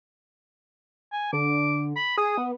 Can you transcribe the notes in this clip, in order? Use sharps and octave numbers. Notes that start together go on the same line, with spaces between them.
G#5
D3 D6
B5
G#4 D#6
B3